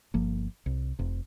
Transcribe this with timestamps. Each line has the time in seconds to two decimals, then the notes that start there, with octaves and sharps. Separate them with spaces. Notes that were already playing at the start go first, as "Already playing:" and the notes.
0.14 G1 F3 A#3
0.66 C2
0.99 F1 C3